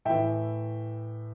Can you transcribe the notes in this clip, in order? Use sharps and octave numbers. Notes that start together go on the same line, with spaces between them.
A2 E3 E5 G5